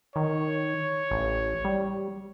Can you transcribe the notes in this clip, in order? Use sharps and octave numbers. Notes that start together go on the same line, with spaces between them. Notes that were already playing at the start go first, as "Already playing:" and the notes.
D#3 C#5
A1
G3